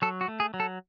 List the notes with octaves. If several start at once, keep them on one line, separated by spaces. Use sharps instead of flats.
F#3 A4
F#4
A3
G#4
F#3
A4